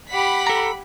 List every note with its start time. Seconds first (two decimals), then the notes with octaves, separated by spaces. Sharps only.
0.10 G4 F#5 B5 B6
0.47 A4 A#5